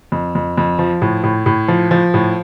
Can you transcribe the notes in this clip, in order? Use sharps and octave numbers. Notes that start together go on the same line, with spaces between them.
F2
F2
F2
F3
A2
A2
A2
F3
F3
A2